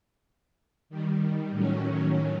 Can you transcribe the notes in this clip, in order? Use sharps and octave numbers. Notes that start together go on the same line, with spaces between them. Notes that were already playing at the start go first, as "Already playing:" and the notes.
D#3 G3
A2 D#3 F#3 C#4